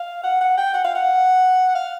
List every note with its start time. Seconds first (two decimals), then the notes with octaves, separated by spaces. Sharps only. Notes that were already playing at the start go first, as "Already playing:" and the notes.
Already playing: F5
0.24 F#5
0.41 F#5
0.58 G5
0.74 F#5
0.84 F5
0.95 F#5
1.75 F5